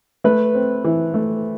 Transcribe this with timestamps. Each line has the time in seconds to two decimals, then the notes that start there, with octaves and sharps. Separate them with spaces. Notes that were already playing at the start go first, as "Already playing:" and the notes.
0.24 A3 B4
0.55 C4
0.84 E3
1.14 A3